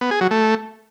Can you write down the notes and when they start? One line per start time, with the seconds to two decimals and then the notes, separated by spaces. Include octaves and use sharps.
0.01 B3
0.11 G#4
0.21 F#3
0.31 A3